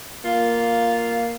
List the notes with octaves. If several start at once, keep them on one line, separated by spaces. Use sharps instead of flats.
A#3 F4